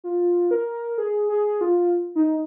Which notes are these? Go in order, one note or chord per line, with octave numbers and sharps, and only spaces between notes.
F4
A#4
G#4
G#4
F4
D#4